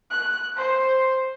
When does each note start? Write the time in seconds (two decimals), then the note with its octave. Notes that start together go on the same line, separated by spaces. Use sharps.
0.11 F#6
0.57 C5